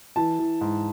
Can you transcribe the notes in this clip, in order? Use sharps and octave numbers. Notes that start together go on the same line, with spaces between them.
E3 A5
E3
G#2